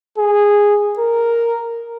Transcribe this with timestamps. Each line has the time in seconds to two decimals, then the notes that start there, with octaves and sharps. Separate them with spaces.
0.18 G#4
0.98 A#4